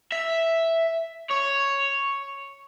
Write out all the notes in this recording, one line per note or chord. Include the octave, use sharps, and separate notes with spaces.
E5
C#5